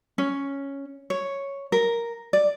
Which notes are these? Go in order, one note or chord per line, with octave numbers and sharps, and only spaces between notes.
C#4
C#5
A#4
D5